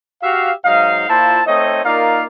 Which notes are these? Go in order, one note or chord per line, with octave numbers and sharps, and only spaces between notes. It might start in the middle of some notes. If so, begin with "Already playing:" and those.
F#4 G4 E5 F5
G#2 F#3 D#4 D#5 F5
A#2 A#3 E4 F4 C5 A5
A3 C4 D#4 C#5 D#5
A#3 D#4 F4 A#4 D5 F5